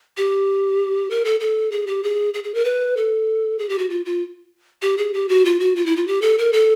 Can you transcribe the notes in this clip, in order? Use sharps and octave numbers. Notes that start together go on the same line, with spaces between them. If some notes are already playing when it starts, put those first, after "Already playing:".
G4
A#4
A4
A4
G#4
G4
G#4
G#4
G#4
A#4
B4
A4
G#4
G4
F#4
F4
F4
G4
G#4
G4
F#4
F4
F#4
F4
E4
F4
G4
A4
A#4
A4